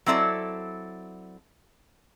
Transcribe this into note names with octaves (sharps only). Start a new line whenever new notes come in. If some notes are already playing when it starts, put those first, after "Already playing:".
F#3 C4 E4 A4 D5